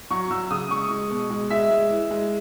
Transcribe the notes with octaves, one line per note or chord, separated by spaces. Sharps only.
F#3 C#6
F#3 E6
C#3 D#6
G#3 C#6
G#3
B2
G#3
G#3 E5
G#3
E3
G#3